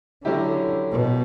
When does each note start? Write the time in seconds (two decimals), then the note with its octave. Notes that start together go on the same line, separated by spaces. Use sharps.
0.25 D3 F#3 C#4 E4 G4
0.92 B2